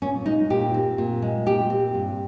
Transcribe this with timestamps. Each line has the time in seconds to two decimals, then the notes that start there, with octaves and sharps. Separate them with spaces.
0.02 A#2 C#4
0.26 G#3 D#4
0.50 A#2 G4
0.74 C4
0.98 A#2
1.22 G#3
1.46 A#2 G4
1.70 C4
1.94 G2